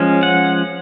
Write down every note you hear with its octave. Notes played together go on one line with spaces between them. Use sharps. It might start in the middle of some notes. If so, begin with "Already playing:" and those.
Already playing: F3 G#3 C#4
F#5